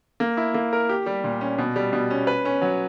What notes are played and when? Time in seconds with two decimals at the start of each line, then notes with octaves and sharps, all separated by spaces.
0.20 A#3
0.37 E4
0.54 A#3
0.73 A#4
0.89 G4
1.06 G3
1.24 A#2
1.41 C#4
1.58 B2
1.76 G3
1.93 B2
2.10 C#4
2.27 B4
2.45 C#4
2.62 F#3